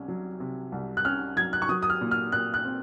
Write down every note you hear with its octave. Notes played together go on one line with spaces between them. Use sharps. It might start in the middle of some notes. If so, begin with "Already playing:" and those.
Already playing: C2 C3 C#4
F#3
C3
C2
F#6
C#4 F6
F#3 G#6
F#6
C#6
F#3 D#6
D#6
F6
A#2
F6
A#2 F#6
F#6
C4